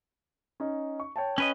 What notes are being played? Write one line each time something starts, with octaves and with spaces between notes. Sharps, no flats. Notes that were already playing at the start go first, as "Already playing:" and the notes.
C#4 D#4
C#6
C#5 G5 A5
C#4 B4 D#5